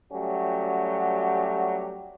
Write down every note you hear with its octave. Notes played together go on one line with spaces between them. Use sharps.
F#3 G3 A3 C#4 F#4 G4